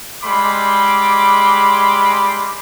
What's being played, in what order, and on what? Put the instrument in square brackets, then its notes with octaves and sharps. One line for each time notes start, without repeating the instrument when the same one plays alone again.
[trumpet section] G3 G#3 B5 C6 D6